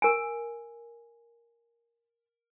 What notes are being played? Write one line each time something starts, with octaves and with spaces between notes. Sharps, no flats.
A#4 G#5